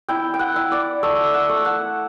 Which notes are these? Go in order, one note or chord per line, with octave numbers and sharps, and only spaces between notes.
E4 G5
G5
F#5
E4
D5
A3 E5
F#5
A3
F#5